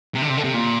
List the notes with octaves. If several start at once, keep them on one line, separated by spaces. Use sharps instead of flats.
C3
D3
C3
D3
C3
A#2